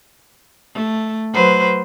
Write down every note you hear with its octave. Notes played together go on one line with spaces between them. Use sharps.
A3
F#3 B4 C5